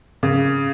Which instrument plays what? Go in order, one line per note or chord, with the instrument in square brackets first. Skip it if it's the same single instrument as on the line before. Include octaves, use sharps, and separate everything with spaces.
[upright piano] C#3